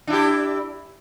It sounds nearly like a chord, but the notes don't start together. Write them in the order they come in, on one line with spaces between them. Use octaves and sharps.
D4 E4 G4